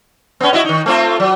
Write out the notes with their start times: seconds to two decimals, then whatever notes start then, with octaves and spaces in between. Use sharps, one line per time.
0.41 B3 C#4
0.53 E4 F#4 D#5
0.65 D#3 D#4
0.86 A3 C4 F4
1.20 F#3